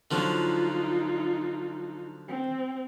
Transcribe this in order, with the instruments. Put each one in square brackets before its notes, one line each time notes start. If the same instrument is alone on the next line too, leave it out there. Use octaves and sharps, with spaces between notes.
[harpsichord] D3 F3 F#3 [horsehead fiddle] D#4 F4
[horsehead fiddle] C4